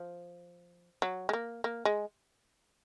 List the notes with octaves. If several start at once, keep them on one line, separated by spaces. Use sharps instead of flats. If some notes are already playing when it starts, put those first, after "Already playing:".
Already playing: F3
F#3
G#3
A#3
A#3
G#3